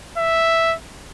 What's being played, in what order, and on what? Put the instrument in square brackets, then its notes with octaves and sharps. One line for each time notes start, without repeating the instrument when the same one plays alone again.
[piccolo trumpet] E5